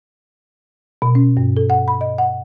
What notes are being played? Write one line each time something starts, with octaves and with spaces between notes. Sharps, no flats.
B2
C#4
G2
A4
F#5
B5
D#5
F#5